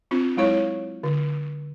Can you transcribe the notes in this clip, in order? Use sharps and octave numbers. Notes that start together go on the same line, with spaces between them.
C4 D4 F4
F#3 G#3 E4 C#5
D3